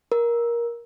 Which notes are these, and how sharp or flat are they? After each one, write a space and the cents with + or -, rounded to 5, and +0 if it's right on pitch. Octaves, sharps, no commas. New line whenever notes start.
A#4 +15